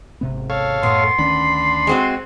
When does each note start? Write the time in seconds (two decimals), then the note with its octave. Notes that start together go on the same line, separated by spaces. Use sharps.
0.21 G#1 C3 B3
0.50 A4 C#5 F5
0.83 F#2 A2 B3 C6
1.19 D2 D#3 C#4 D4 B5
1.87 G#3 C4 F#4